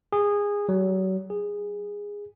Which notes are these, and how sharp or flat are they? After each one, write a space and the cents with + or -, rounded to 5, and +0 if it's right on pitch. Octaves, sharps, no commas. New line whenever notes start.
G#4 -20
F#3 +35
G#4 -15